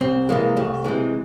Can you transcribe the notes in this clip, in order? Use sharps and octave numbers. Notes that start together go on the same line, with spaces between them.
C2 C4
C3 E3 G#3 A#3
C2 A3
C3 E3 G#3